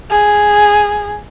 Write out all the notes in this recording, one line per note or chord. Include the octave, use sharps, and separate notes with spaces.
G#4